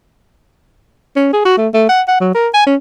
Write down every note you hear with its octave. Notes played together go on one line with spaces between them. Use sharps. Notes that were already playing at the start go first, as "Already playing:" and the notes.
C#4
G#4
F#4
A3
A3
F#5
F#5
F#3
A#4
G#5
C#4